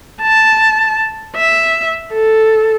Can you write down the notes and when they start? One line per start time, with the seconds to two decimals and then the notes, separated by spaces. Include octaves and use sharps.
0.22 A5
1.36 E5
2.13 A4